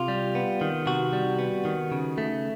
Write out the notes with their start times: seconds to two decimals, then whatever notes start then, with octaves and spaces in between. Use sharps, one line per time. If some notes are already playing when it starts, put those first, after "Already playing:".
Already playing: C3 F4
0.08 G3
0.35 B3
0.61 D#3
0.87 C3 F#4
1.13 G3
1.38 B3
1.65 D#3
1.92 C#3
2.18 A3